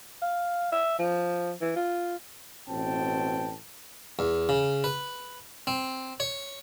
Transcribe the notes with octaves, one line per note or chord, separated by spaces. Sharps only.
F5
E5
F3
E3
F4
A1 B2 C4 G5 A5
E2
C#3
B4
C4
C#5